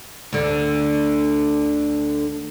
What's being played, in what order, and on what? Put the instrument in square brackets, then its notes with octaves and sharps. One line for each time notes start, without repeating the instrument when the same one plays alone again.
[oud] D2 D3